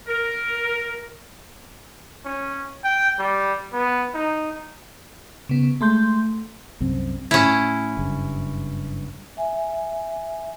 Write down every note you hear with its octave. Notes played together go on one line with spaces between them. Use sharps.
A#4
C#4
G5
G3
B3
D#4
C#3 B3
G#3 A3 C6 G6
C2 F#2 C4
A2 C#4 E4
F#1 G2
E5 G#5